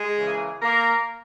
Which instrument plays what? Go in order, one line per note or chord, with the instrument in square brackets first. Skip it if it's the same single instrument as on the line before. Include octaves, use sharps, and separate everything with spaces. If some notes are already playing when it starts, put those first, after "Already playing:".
Already playing: [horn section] G#3 G#4
C#3 E3 A#3
A#3 A#4